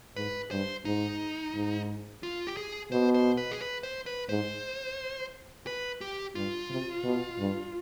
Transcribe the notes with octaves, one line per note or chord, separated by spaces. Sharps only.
G#2 B4
G2 C5
G#2 D#4
G#2
F4
G4
G#4
B2 C5
C5
B4
G#4
B4
C5
B4
G#2 C5
B4
G4
G2 F4
C3
B2
G2